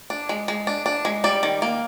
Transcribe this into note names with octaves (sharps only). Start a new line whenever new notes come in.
D4
G#3
G#3
D4
D4
G#3
G3 D5
D#3
A#3